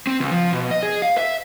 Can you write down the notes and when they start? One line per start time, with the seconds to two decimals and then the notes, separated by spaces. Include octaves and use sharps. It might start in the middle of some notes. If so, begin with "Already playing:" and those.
0.07 C4
0.20 C#2
0.32 F3
0.53 B2
0.71 D#5
0.83 G#4
1.02 F5
1.18 E5